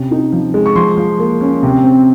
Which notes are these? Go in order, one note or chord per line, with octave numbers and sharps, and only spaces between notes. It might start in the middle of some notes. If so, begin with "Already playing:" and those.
Already playing: C3 C#4
D#4
F3
G#3
C#6
F3 C6
F3
A#3
C#4
C3
C4